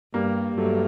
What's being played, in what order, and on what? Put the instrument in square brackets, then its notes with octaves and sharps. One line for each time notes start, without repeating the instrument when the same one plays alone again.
[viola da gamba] G2 [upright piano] G3 A#3
[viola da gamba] G2 [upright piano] F#3 A3